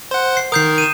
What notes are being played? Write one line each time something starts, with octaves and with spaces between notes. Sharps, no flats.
C5 F#5
C7
D#3 A#4 D#6 G6 C7
D#7 E7